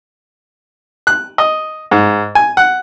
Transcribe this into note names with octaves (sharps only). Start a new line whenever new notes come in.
F#6
D#5
G#2
G#5
F#5